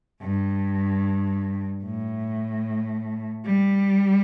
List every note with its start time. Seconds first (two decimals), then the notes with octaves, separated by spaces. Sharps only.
0.21 G2
1.84 A2
3.45 G3